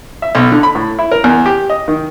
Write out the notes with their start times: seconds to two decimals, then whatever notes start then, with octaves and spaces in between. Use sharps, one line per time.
0.22 E5
0.35 B1
0.52 D3
0.63 B5
0.75 A2
0.99 E4
1.12 A#4
1.24 E2
1.46 G4
1.70 D#5
1.88 D#3